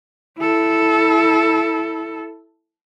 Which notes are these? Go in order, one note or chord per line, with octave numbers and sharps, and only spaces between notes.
E4 A4